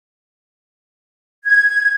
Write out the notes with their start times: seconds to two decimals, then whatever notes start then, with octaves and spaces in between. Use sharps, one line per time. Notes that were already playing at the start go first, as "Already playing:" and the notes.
1.44 G#6